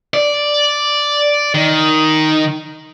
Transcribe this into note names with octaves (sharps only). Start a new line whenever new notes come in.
D5
D#3